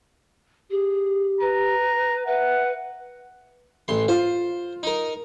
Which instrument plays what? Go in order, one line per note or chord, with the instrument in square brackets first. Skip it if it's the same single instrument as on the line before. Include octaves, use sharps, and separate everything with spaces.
[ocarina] G4 [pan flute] G#4
[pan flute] B4 [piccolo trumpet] A#5
[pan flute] B4 [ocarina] E5 [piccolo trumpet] F#5
[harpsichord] A1 C6
[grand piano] F4 [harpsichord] C5
[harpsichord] D#4 A#4